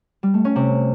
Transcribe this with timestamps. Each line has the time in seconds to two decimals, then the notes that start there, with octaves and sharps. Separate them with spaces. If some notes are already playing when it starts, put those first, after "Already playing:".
0.23 G3
0.34 A3
0.45 C#4
0.56 C3